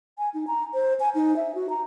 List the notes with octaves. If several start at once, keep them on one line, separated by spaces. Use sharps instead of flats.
G#5
D#4
A#5
C5
G#5
D#4
E5
F#4
A#5